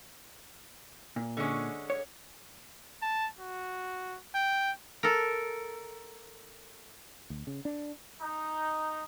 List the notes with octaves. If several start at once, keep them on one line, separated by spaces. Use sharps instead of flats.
A#2
D3 G#3 C#4
C#5
A5
F#4
G5
A4 A#4
D2
C#3
D4
D#4